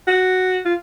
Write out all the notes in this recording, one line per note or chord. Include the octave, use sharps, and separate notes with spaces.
F#4
F4